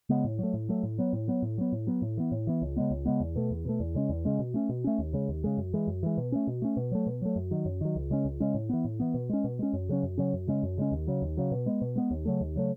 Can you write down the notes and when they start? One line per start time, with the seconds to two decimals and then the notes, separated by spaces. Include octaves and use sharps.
0.09 C#3 G#3 B3
0.25 A2
0.39 F#3 A3
0.54 A2
0.69 F#3 A3
0.83 A2
0.98 F#3 B3
1.13 A2
1.28 F#3 B3
1.42 A2
1.58 F#3 B3
1.72 A2
1.87 F#3 B3
2.02 A2
2.17 E3 B3
2.32 A2
2.47 E3 B3
2.62 C#2
2.76 C#3 G#3 B3
2.91 C#2
3.05 C#3 G#3 B3
3.20 E2
3.36 B2 A3
3.51 E2
3.65 B2 A3
3.80 E2
3.95 C#3 G#3 C#4
4.09 E2
4.25 C#3 G#3 C#4
4.39 B2
4.54 A3 C#4
4.69 B2
4.84 A3 C#4
4.99 D#2
5.13 C#3 G#3
5.29 D#2
5.44 C#3 G#3
5.58 F#2
5.73 E3 G#3
5.87 F#2
6.03 E3 G#3
6.18 B2
6.32 A3 C#4
6.47 B2
6.62 A3 C#4
6.77 B2
6.91 F#3 A3
7.07 B2
7.22 F#3 A3
7.36 F#2
7.51 D#3 F#3
7.65 F#2
7.81 D#3 F#3
7.96 C#2
8.10 C#3 G#3 C#4
8.25 C#2
8.40 C#3 G#3 C#4
8.54 A2
8.69 E3 B3
8.85 A2
9.00 E3 B3
9.14 B2
9.29 G#3 C#4
9.44 B2
9.59 G#3 C#4
9.73 F#2
9.89 C#3 F#3 C#4
10.03 F#2
10.18 C#3 F#3 C#4
10.34 F#2
10.47 C#3 G#3 C#4
10.63 F#2
10.78 C#3 G#3 C#4
10.92 D#2
11.07 C#3 F#3
11.22 D#2
11.37 C#3 F#3
11.52 B2
11.66 G#3 B3
11.82 B2
11.96 G#3 B3
12.11 D#2
12.25 C#3 F#3 A3
12.41 D#2
12.56 C#3 F#3 A3